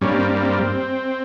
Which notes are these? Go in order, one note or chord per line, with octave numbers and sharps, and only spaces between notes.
G2 G3 A#3 C#4
C4
C4